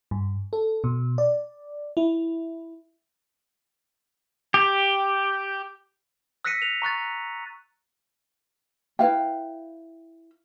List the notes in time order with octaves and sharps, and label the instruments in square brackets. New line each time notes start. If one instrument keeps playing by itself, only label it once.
[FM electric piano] G2
A4
B2
D5
E4
[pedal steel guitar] G4
[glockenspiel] E6 F#6 A#6 B6 C#7 D#7
F7
A#5 C#6 F#6 A6
[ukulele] E4 B4 F5 G5